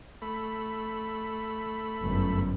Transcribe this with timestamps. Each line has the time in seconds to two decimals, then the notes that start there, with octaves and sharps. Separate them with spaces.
0.22 A3 B5
2.01 G1 F#2